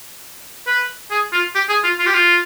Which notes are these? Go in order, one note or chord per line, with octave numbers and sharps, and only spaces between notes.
B4
G#4
F4
G4
G#4
F4
F4
G4
F4